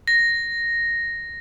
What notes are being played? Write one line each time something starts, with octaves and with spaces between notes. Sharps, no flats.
A#6